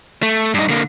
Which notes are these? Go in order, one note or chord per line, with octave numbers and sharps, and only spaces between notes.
A3
G2 D#4
D3 A#3